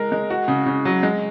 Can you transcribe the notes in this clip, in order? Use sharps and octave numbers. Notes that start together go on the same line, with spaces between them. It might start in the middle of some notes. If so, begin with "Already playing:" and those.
Already playing: G#3 A#4
G#3
F#4
C#3
C#3
F#3
G#3